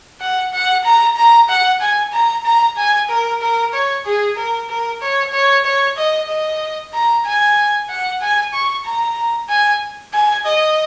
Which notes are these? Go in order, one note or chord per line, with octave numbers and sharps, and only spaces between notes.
F#5
F#5
A#5
A#5
F#5
G#5
A#5
A#5
G#5
A#4
A#4
C#5
G#4
A#4
A#4
C#5
C#5
C#5
D#5
D#5
A#5
G#5
F#5
G#5
C#6
A#5
G#5
G#5
D#5